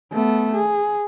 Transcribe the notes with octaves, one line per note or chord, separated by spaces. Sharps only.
A3 B3
G#4